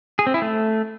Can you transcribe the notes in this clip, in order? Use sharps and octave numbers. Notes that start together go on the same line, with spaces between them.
G#4
C4
E4
A3